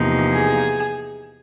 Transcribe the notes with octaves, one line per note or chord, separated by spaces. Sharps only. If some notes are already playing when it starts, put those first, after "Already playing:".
Already playing: E2 C3 F3 A#3 D#4
G#4